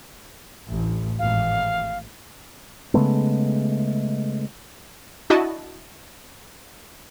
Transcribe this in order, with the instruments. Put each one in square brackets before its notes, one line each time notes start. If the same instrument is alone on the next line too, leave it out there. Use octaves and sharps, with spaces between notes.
[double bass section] A1 D2
[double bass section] G#1 A2 E3 [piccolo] F5
[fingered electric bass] C#3 G#3 A3 B3
[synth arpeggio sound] D4 E4 F#4 D#5 A5